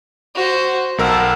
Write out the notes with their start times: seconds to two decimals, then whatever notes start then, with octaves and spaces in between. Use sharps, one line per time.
0.35 F#4 C5
0.98 B1 A#4 F#5 A5 E6